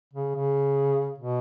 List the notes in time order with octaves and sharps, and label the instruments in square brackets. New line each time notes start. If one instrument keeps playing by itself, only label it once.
[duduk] C#3
C#3
B2